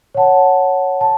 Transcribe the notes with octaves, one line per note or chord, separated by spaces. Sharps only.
C#5 F#5 A5
A5